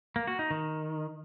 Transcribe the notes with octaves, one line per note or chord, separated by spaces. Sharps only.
A#3
F#4
D#4
D#3